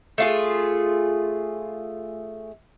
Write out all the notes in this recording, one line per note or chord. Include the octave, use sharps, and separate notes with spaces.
A3 F4 G#4